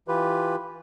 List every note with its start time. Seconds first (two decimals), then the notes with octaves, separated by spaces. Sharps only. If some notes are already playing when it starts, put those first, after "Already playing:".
0.08 E3 F4 G4 B4